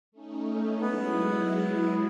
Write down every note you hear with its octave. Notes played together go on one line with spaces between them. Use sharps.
A3 C#4 D#4
F#3 G#3 B3 E4